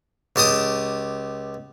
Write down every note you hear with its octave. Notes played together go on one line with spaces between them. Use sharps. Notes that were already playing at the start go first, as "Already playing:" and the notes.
C#2 G4 A5 D#6